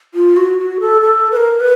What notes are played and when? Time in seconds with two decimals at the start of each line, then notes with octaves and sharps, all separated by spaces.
0.14 F4
0.37 F#4
0.58 F#4
0.80 A4
1.02 A4
1.32 B4
1.36 A#4
1.60 B4